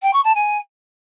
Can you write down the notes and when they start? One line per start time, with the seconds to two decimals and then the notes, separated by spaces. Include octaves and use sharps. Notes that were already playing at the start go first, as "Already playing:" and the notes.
0.02 G5
0.13 C#6
0.24 A5
0.35 G#5